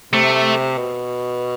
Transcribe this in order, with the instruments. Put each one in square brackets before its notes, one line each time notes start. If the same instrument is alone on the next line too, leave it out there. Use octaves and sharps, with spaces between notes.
[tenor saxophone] C3 [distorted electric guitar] A3
[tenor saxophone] B2